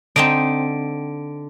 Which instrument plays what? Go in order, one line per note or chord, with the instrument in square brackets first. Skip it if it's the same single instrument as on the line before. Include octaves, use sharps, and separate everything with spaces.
[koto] D3 [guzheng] C4 D#4 D#5 [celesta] D7